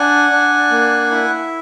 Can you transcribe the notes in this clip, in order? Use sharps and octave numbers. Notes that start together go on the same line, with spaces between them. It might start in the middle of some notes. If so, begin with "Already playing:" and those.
Already playing: D4 F#5 G#5
D4
A#3
E4